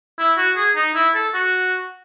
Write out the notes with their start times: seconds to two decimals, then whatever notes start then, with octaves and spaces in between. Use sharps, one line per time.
0.19 E4
0.37 F#4
0.56 G#4
0.76 D#4
0.95 E4
1.15 A4
1.34 F#4